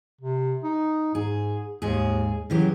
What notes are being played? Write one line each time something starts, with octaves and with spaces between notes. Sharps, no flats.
C3
D#4
G#2 G#4
D#2 G#2 G#4
C#3 E3 F#3 G4